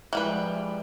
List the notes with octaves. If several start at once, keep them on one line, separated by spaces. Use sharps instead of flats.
E3 F3 G3 G#3 B4